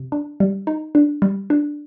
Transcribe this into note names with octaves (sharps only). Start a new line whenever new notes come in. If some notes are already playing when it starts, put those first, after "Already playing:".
Already playing: C3
D4
G3
D#4
D4
G3
D4